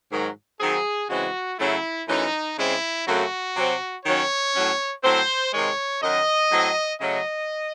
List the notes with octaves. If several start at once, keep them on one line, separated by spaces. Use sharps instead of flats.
G#2 D#3 F#3
D#3 F#3 C4 G#4
C#3 E3 G#3 C4 F#4
C#3 F#3 A3 C#4 E4
F#2 E3 A3 C#4 D#4
C#3 G#3 C4 E4
F#2 C#3 F#3 A3 C4 F#4
C3 F#3 C4
D#3 F#3 C#4 C#5
A2 F#3 C#4
A2 F#3 C4 C5
C3 D#3 G#3 C#5
F#2 D#3 F#3 D#5
A2 F#3 C4
C#3 F#3 A3 C#4 D#5